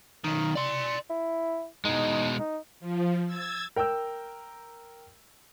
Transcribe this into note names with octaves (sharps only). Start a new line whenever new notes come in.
B1 D#3
D5 C6
E4
B2 G#3 D#4
D#4
F3
E6 G#6 A6
A#4 G5 A#5 E6 G6